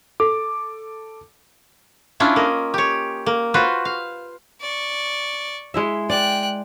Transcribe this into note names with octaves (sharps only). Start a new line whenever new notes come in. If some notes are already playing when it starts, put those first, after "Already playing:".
A4 D6
C#4 D4 E4 F4
A#3 D#5
G4 C#5
A#3
F4 F#4 B4 C5
F5
D5 C#6
G#3 E4 E5
D5 G5 F#6